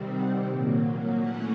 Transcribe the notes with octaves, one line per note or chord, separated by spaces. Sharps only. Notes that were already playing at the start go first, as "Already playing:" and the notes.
Already playing: C3 D#3 G3 C4
F#5
A#2 F#3 A#3
E3 A3 C#4 F#5